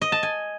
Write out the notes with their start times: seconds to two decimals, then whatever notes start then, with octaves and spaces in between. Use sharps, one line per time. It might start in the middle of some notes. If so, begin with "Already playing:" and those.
0.01 D#5
0.12 A5
0.23 G#5